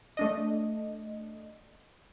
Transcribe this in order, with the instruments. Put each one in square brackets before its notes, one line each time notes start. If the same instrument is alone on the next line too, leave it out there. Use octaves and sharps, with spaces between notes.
[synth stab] A3 D4 D#5